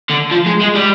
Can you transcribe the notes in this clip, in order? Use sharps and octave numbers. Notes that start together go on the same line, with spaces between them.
D3
F3
G#3
G#3
G3